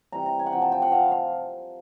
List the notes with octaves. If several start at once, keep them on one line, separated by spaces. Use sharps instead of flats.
C3 E3 G3 A#5
A#5
G#5
F#5
C3 F3 G5
A5
G5
F#5
C3 F3 F5
F5